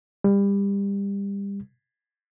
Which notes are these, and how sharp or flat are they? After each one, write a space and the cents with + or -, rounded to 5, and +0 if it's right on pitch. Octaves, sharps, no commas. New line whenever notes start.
G3 +25